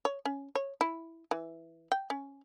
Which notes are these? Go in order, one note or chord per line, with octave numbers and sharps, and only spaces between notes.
C#5
C#4
C#5
E4
E3
G5
C#4